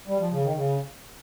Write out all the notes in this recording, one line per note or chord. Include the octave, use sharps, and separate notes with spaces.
G3
F3
C#3
D#3
C#3